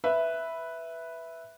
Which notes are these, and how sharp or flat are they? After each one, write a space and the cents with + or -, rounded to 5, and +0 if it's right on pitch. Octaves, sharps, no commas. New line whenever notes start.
B4 +0 E5 +0